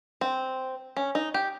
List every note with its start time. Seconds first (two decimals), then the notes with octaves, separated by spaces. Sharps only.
0.21 C4
0.97 C#4
1.15 D#4
1.34 G4